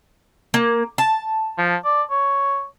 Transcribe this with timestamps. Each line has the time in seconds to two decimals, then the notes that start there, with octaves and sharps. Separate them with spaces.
0.54 A#3
0.98 A5
1.58 F3
1.85 D5
2.10 C#5